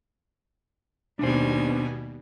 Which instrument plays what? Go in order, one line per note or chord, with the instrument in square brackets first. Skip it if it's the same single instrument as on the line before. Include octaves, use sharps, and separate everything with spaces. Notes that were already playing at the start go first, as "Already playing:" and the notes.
[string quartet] D#2 G3 G#5 [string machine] B2 [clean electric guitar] D4 C5